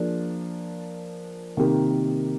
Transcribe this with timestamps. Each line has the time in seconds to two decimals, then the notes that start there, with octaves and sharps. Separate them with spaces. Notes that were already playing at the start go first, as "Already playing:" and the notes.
Already playing: F3 A#3 D4 G#4
1.57 C3 D#3 A#3 D#4 G4